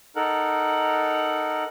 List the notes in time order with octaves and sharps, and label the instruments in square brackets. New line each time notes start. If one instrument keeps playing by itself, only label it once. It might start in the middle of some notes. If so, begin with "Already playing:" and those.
[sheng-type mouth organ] D#4 A4 A#4 F#5